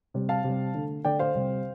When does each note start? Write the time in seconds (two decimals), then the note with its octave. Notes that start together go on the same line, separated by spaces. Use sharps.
0.14 C3 G3
0.29 F5 A5
0.44 C3
0.49 G3
0.75 D3 A3
1.04 D3 A3 D5 G5
1.19 C5 F5
1.35 C3 G3